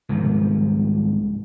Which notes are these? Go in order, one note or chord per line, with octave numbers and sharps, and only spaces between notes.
C2 G#2 D#3 F3